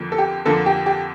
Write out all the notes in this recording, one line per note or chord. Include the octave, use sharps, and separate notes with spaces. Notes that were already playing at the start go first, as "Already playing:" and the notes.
Already playing: F2 D3 F3 A#3
A4
G4
F2 D3 F3 A#3 A4
G4
G4